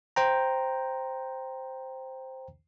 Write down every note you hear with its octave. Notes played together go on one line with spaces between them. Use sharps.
C5 G5 A#5